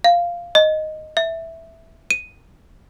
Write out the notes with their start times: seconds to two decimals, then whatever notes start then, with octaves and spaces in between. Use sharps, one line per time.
0.04 F5
0.55 D#5
1.17 E5
2.11 D#7